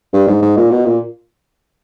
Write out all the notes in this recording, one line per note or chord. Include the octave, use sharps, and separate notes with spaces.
G2
G#2
G#2
A#2
B2
A#2